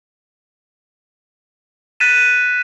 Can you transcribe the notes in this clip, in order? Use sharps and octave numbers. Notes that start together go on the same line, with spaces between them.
F#6 A6 B6 D#7 E7